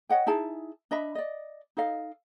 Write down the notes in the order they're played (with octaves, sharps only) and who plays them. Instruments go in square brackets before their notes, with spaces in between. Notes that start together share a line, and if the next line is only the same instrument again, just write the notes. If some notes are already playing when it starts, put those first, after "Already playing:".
[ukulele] C#5 D#5 F#5 G5
D#4 E4 G#4 A5
D4 D#5 E5 B5
D5 D#5
D#4 A4 D#5 F5